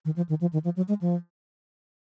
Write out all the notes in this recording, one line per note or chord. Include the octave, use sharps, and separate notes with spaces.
D#3
F3
D#3
F3
D#3
F3
F#3
G#3
F3